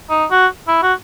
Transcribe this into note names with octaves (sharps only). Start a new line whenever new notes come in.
D#4
F#4
E4
F#4